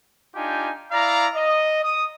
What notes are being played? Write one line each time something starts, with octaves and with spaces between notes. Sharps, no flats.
D4 D#4 F4 G4 G#5
E4 D5 F5 A#5
D#5
D#6